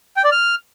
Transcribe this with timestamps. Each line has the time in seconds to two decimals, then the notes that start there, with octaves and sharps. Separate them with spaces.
0.17 G5
0.24 D5
0.31 F6